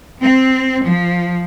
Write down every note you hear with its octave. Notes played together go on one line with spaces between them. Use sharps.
C4
F3